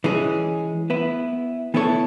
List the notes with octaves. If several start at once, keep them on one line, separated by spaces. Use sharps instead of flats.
E3 G#3 C#4 G#4
B3 E4 B4
E3 B3 E4 A4 C#5